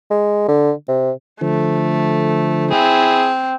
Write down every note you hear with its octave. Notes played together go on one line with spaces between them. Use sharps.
G#3
D3
C3
D3 F3 A3
C4 E4 G#4